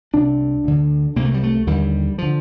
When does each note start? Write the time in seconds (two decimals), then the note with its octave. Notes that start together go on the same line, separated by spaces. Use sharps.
0.13 C2 C3 D4
0.64 D2 D3
1.16 C2 C3 A#3
1.25 A3
1.34 G3
1.43 A3
1.67 D#2 D3 G3
2.18 D3 F3